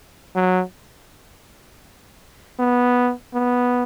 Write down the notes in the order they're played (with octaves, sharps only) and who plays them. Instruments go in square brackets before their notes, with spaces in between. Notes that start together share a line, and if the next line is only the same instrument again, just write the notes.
[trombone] F#3
B3
B3